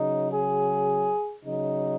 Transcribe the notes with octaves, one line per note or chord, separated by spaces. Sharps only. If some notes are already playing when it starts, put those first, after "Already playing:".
Already playing: C#3 F#3 D#4
G#4
C#3 F#3 D#4